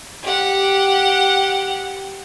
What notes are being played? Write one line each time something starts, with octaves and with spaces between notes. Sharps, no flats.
G4 F#5